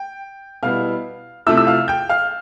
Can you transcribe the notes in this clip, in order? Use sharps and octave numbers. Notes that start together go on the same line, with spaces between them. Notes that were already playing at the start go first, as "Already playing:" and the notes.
Already playing: G5
B2 G3 B3 E4 F5 F6
C3 F3 A3 E4 E5 E6
E6
F5 F6
G5 G6
F5 F6